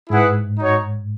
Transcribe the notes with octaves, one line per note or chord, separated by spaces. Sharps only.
G#2 E4 G#4 B4 F#5
D#4 F#4 C#5